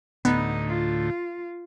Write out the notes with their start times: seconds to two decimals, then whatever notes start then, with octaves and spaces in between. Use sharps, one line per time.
0.25 D2 A2 B3 D#4
0.68 F4